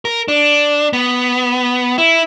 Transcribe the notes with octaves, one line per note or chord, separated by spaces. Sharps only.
A#4
D4
B3
E4